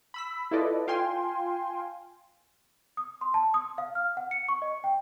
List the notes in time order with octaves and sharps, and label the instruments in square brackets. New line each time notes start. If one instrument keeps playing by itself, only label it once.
[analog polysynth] B5 E6 B6
E4 F4 A4 B4 D5 D#5
F4 F5 G5 G#5 C6
[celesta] D#6
C6
A5
D#6
F5
F6
F#5
C#7
C#6
D#5
G5